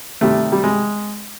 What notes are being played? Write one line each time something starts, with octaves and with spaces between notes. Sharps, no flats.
C3 D#3 G3 A3
G3
G#3